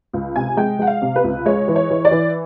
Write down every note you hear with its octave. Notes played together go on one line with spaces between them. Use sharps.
C#2
C3 G#5
G#3 G5
G#3 F#5
F5
C3
B4
C#2
G#3 C#5
E3
C#5
E3
D5
E3